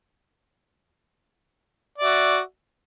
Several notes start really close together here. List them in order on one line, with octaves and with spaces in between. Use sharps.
D5 E5 F#4